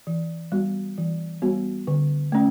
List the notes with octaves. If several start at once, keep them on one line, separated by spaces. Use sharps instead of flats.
E3
G3 B3 F#4
E3
G3 B3 F#4
D3
A3 C#4